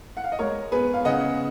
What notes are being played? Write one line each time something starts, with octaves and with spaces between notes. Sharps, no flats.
F#5
F5
D#5
G#3 A#4 C#5
B3 G#4 B4
F5
C#3 D#5 F#5